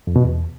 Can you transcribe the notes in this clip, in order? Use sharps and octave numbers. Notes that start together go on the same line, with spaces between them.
F2
B2
E2